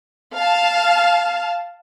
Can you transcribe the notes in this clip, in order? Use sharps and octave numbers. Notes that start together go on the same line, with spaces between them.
F5 A5